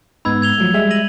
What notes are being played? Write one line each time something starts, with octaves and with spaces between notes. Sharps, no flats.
G#2 B3 D#4 B5 E6 G#6
G#6 F7 G7
F3 F#3 A3
G3 G#3 E5
A#6 D#7 F#7